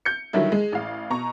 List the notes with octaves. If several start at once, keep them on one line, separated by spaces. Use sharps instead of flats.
G6 C#7
D3 D#3 F#3 G3 E4
G#3
A1 F5
B2 A#5 C#6